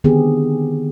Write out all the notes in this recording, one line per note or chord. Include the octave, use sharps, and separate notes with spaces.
D3 D#3 B3 C4 G4 G#4